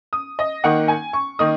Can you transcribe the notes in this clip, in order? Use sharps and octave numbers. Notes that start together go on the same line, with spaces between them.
D#6
D#5
D#3 A#3 D#4 F#5
G#5
C#6
D#3 A#3 D#4 D#6